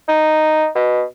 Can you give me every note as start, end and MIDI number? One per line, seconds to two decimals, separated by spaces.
0.09 0.68 63
0.76 1.03 47